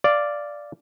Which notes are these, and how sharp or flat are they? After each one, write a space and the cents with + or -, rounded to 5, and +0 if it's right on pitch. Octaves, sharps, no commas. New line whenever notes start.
D5 +0 F5 -15